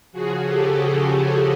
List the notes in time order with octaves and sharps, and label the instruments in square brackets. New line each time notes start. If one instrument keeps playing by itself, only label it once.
[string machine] C#3 F3 F#4 G#4
G4 A4
G4 A4